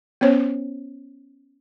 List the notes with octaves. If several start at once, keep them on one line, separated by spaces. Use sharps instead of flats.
B3 C#4 C5 C#5